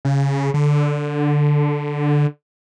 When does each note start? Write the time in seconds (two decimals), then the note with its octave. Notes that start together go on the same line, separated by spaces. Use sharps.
0.05 C#3
0.54 D3